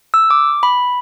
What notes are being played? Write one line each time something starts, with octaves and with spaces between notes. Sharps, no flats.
E6
D6
B5